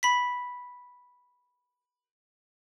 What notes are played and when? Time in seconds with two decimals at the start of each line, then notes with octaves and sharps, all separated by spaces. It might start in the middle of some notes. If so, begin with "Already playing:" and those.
0.03 B5 B6